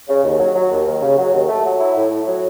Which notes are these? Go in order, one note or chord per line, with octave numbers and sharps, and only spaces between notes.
C#3
D#2
F#3
F#3
D#2
D#2
C#3
F#3
D#2
A3
F#3
E4
A2
A2
F#3